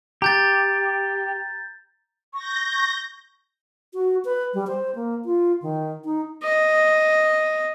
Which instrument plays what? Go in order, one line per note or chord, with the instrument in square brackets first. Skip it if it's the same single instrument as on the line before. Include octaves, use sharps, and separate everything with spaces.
[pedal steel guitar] G4 [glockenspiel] A#5 G6 A6
[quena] C#6 [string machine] G6 A#6
[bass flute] F#4
B4
G3
C5
A#3
F4
D#3
D#4
[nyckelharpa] D#5